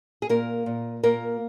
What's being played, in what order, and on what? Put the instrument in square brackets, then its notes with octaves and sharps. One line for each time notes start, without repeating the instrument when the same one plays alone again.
[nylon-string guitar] G#4
A#2 A#3 A#4
A#2
A#2 A#3 A#4